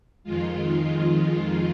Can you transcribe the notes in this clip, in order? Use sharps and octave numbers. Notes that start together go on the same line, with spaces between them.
F2 D#3 G#3 F4